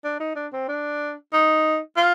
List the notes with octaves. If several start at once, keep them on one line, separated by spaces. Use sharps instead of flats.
D4
D#4
D4
C4
D4
D#4
F4